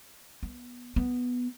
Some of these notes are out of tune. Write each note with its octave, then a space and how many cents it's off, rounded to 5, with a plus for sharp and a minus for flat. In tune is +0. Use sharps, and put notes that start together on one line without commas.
B3 -15
B3 +0